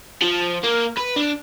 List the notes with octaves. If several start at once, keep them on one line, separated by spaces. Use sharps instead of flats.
F3
A#3
B4
D4